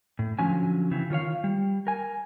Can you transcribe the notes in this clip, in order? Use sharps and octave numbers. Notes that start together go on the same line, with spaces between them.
A2
D3 F3 F#3 C#4 G#5
C#3 E3 C4
D#3 F4 C#5 F5
G3
A#4 G#5